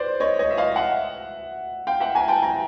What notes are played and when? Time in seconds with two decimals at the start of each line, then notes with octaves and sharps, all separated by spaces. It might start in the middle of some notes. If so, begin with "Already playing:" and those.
Already playing: B4 C5 D5
0.20 C#5 D#5
0.39 C#5 D#5
0.51 E5
0.57 D#5 F5
0.76 E5 F#5
1.87 F5 G5
2.00 E5 F#5
2.15 G#5 A#5
2.28 G5 A5
2.43 G#5 A#5